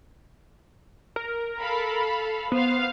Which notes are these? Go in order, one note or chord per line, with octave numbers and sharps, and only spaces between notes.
A#4
A4 F5 B5
B3 C5 F5